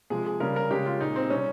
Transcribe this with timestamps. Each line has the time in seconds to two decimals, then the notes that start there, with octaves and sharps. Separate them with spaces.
0.10 C3 F3 G#3 G#4
0.26 G#4
0.40 C#3 G3 A#4
0.56 A#4
0.71 C#3 G#3 G4
0.86 F4
1.01 A#2 G#3 D#4
1.16 C4
1.30 C3 G3 C#4